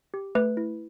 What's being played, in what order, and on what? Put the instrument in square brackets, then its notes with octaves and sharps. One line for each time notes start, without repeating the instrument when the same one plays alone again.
[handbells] G4
A3 B4
E4